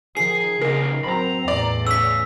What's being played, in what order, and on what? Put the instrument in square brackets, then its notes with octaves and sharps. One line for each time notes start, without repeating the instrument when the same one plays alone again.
[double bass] D#3 F3 [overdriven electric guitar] G#4 [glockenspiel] C7
[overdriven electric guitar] E2 D#4 [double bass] C#3 [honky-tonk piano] A#4
[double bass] F#3 C4 [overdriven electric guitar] A#5 B5
[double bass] E2 A2 [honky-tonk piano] D5
[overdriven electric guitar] C#3 [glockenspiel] E6 B6